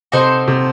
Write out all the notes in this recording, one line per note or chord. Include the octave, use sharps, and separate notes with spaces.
C3 D#4 F#4 A4 C5
C3